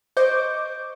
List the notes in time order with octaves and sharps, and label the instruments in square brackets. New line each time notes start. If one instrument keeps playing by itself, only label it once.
[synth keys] C5 D#5 C#6 D6 G6